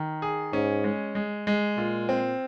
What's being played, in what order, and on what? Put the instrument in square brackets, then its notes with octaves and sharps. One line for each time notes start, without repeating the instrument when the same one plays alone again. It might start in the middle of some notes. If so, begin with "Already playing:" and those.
Already playing: [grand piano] D#3
G#4
[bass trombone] G#2 [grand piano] C#4
[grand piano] G#3
G#3
G#3
[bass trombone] A#2 [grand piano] F4
[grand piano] C4